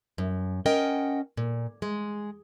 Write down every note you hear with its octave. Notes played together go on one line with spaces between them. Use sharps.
F#2
C#4 A#4 D#5 F#5 G5
A#2
G#3